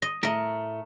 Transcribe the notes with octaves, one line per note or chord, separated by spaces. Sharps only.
D#5
A2 A3 A#4 D#5